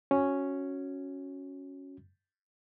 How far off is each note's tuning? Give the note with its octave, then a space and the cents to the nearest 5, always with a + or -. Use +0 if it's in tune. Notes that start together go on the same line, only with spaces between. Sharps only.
C#4 +0 F#4 -10